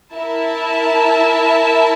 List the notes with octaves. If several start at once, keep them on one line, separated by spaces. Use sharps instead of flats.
E4 A#4 E5 A5